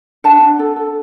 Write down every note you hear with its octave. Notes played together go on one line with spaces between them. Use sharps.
D4 F#5 A5
D4
A4
A4